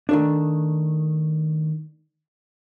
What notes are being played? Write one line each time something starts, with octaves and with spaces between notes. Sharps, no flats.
D#3 A3 D4